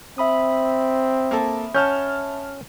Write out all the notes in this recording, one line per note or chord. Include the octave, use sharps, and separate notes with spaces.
C4 E5 B5 D#6
A#3 A4
C#4 C#5 F#5 A5 F6 G6